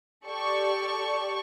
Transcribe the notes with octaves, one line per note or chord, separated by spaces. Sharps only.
G4 A4 D5 C#6